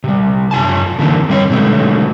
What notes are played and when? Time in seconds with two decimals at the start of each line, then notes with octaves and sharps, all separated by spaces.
0.04 C3 G3
0.51 F#2 F4 G#5 A5
0.99 D3 E3 F#3 A3 A#3 C4
1.29 G3 C4 C#5
1.50 B2 D3 F#3 G#3 A3